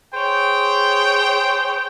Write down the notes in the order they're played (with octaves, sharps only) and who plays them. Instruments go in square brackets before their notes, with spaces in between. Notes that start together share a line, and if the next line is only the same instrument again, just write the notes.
[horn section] G#4 C5 C#5 G5